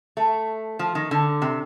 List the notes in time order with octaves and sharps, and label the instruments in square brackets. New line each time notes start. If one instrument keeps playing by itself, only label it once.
[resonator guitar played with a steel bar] A3
F3
D#3
D3
C3